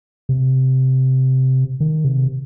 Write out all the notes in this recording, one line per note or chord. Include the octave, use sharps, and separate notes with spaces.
C3
D#3
C3